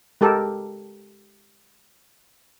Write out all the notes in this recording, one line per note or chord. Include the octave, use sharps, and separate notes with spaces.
G#3 G4 A4 A#4